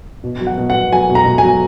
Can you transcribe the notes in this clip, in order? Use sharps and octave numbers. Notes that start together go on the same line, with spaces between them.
B2
F#3
F#5
B2
F#5
B2
F#3 G#5
B2
A#5
B2
G#5
F#3